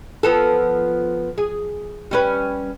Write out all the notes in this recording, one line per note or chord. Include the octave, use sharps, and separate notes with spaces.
F3 B3 A4
G#4
G3 C#4 B4